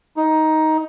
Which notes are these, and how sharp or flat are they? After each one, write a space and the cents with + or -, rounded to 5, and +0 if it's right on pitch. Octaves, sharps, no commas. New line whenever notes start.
D#4 +10